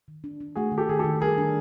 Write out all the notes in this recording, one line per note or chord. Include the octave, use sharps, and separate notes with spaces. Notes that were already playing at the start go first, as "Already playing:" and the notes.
D#3
D4
D4
A3 F#4 G#4
D#3
G4 A4
D#3 G#4
D#3 G4 A4
G3 G#4 A#4
D4